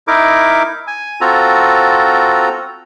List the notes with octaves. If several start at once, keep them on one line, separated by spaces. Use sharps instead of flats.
D#4 E4 A#4 D6
G#5
C4 F4 F#4 A4 A#5